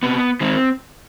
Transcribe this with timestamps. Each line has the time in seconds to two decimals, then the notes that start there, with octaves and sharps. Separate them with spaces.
0.03 C3 B3
0.41 D#3 G#3 C4